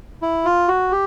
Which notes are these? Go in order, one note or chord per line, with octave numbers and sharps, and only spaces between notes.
E4
F4
F#4
G4